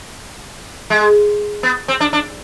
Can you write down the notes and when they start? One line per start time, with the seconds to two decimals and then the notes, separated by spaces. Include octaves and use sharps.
0.90 G#3
1.63 B3
1.88 C4
2.00 D4
2.13 D4